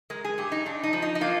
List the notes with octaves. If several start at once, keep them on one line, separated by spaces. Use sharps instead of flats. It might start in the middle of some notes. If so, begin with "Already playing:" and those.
G#3 A#4
G#4
G2 G4
D#4
G2 D4
D#4
F3
D#4
D#4
A#3 F4